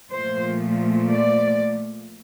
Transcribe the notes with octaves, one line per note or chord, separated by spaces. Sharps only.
A#2 F3 A3 C5
D5